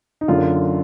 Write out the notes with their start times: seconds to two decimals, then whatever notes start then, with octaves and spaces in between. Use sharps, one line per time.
0.21 D#4
0.28 F#1 F#2 D3 F4